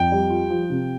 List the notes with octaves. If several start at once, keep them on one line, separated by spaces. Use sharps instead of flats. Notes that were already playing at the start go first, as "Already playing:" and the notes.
Already playing: F2 G5
G3
F4
F3
C3